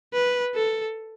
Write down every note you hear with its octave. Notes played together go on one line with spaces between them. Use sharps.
B4
A4